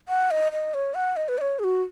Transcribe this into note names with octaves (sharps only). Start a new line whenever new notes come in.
F#5
D#5
D#5
C#5
F#5
D#5
B4
D#5
C#5
G#4
F#4